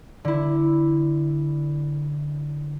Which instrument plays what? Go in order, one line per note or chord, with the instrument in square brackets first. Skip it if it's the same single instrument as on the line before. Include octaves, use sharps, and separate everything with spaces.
[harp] D3 E4